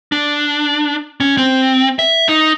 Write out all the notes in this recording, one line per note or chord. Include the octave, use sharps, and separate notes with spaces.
D4
C#4
C4
E5
D#4